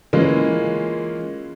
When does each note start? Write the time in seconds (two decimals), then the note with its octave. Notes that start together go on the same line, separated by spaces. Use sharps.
0.13 E3 G#3 A#3 C#4 F4